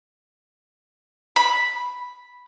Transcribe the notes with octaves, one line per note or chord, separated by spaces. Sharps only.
B5